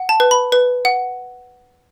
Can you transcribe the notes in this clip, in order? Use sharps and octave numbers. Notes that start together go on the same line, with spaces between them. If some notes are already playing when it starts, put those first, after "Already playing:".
Already playing: F#5
A5
B4
B5
B4
F#5